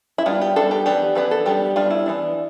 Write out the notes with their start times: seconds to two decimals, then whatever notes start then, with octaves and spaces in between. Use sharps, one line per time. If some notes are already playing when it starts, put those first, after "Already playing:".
0.18 E4
0.26 G3 B3 D4 F4
0.42 G4
0.56 G3 B3 D4 A4
0.71 G4
0.86 E3 B3 D4 G4
1.15 E3 B3 D4 B4
1.31 A4
1.46 G3 B3 D4 G4
1.76 G3 B3 D4 F4
1.91 E4
2.06 E3 B3 D4